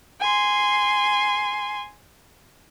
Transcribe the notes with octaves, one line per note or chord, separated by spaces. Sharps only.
G#5 C6